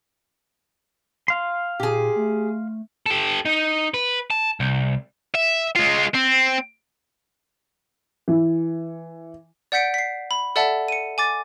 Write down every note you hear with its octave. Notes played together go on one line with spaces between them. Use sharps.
F5 C6
A#2 G4 G#4
A3
G4 A4
D#4
B4
A5
C2
E5
G#3 F4
C4
E3
D5 F#5 G6 B6 C#7 D7
B6 C7
B5
A4 D5 E5 F#5 A5
C#7 D#7
G#5 D6 A6